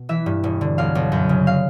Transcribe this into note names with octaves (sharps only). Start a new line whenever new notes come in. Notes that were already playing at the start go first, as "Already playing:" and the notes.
Already playing: B2
E3 E5
G2
E1
D3
B1 F5
B1
F#2
C#3
F5